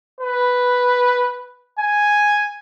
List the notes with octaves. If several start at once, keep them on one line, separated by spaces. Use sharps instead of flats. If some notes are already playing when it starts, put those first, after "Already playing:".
B4
G#5